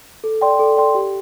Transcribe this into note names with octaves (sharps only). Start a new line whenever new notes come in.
A4
D5 G5 C6
A4
D5 G5 C6
G4